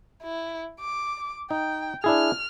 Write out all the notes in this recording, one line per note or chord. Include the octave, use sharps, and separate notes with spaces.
E4
D6
D#4 G5
D4 E4 G#4 F6